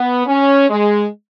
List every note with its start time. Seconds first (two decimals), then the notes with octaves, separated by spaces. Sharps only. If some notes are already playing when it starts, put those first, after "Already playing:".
Already playing: B3
0.27 C#4
0.69 G#3